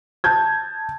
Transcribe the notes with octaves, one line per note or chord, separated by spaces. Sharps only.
A5 G6 G#6